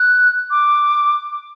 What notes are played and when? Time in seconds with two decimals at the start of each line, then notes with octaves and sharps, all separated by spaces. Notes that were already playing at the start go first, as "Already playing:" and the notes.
Already playing: F#6
0.51 D6